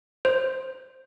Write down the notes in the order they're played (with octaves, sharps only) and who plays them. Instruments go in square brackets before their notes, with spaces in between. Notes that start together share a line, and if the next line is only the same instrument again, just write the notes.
[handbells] C5